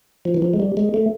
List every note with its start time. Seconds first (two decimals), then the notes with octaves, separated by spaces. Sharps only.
0.25 F3
0.34 E3
0.42 F3
0.54 G#3
0.60 G3
0.77 G#3
0.94 A3